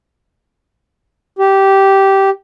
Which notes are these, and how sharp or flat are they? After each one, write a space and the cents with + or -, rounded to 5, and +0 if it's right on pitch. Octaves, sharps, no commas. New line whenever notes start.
G4 -10